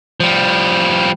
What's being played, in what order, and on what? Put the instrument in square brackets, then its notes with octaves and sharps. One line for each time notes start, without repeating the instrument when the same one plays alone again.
[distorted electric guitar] F3 G3